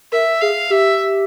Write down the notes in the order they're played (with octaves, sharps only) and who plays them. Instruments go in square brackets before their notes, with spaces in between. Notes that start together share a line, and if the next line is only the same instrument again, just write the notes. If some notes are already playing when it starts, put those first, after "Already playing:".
[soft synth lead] A#4 [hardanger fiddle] E5
[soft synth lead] G#4 [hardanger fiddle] F5
[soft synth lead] G4 [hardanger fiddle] E5